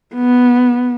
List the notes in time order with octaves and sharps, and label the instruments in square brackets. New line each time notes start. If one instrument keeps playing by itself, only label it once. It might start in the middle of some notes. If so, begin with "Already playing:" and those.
[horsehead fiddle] B3